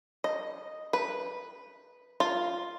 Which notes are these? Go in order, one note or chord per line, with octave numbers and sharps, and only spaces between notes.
D#5
B4
F4